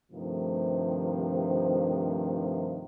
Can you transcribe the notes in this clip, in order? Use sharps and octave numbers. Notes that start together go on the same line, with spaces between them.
G2 C3 D#3 F3 A3